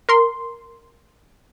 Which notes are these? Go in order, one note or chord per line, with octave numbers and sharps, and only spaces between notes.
A#4 C6